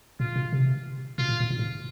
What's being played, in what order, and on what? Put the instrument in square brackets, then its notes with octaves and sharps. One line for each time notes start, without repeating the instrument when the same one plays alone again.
[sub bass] A#2 [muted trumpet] F4
[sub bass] B2
C3
[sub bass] B2 [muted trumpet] F4
[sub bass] A2
A2
A#2
A2